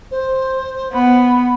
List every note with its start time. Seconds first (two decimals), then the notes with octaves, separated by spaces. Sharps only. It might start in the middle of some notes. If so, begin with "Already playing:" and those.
0.11 C5
0.93 B3 B5